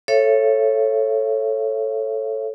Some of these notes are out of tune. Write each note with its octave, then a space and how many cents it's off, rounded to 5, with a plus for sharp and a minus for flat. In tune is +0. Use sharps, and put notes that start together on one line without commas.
A4 +0 C#5 -15 E5 +35